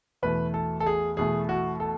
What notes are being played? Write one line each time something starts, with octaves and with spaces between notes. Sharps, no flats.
E2 B2 A3 B4
A4
A4
G#4
E2 B2 A3 G#4
F#4
A4